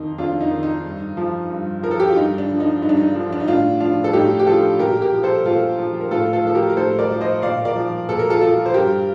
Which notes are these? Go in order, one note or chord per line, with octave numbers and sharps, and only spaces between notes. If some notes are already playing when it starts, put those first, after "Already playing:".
Already playing: F2 D#3 D#4
F2 D4 F4
D#4
D#3
D#4
G2
F3
G2
F3 A#4
A4
G4
F4
G2 D#4
D4
D3 F3
D#4
G2 D#4
D4
D#4
D3 F3
D4
D#4
A2 D4 F4
F3 D4 F4
A4
A2 D#4 G4
G4
F3 F4 A4
A#2 G4 A#4
G4 A#4
F3
A4 C5
A#2 F4 A4
F3
A#4
A2 F4 A4
F4 A4
F3 A4
G4 A#4
A#4
A2 A4 C5
A#4 D5
F3
C5 D#5
A#2 D5 F5
A#4 D5
F3
A#2 A4
A#4
F4 A4
F3 F4 A4
C5
G2 G4 A#4